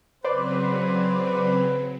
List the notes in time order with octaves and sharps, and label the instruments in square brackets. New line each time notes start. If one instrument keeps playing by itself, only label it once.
[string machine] C#3 F#3 C4 [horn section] B4 [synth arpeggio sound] C5 D5